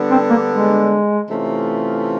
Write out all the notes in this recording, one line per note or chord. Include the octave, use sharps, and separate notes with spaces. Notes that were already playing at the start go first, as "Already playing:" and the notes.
Already playing: D3 G3 B3 D4
C4
A#3
G#3
C3 E3 A3 C#4 F4